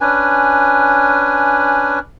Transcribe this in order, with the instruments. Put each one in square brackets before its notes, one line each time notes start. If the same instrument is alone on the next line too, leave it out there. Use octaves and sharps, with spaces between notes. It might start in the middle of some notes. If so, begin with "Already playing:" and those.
[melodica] C#4 D4 B4 G#5